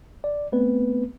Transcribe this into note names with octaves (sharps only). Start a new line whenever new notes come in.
D5
A3 B3 C4 B4